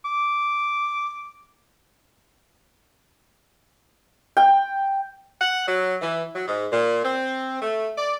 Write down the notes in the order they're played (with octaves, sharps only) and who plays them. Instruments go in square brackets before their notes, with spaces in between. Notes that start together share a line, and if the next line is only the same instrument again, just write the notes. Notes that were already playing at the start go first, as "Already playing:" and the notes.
[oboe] D6
[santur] G5
[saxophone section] F#5
F#3
E3
F#3
G#2
A#2
C4
A3
D5